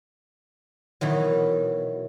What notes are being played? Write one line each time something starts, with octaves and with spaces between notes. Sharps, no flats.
B2 D#3 E3 F#3